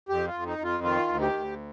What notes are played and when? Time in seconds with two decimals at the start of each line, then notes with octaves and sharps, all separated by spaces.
0.09 F2 G4
0.27 F4
0.33 F2
0.46 D#4
0.58 F2
0.64 F4
0.83 D#3 F4
1.08 D2
1.21 G4
1.33 D2